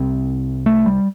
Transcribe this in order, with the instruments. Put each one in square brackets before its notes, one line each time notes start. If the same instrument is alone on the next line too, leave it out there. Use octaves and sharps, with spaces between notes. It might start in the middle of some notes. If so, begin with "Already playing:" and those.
Already playing: [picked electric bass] C2 C3 C4
A3
G3